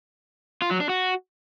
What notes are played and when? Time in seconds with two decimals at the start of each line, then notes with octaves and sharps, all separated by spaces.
0.62 F4
0.71 F#3
0.80 D4
0.89 F#4